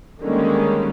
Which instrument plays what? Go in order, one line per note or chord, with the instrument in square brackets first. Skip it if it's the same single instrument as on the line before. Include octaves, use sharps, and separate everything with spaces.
[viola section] D3 D#3 G3 G#3 A#3 C#4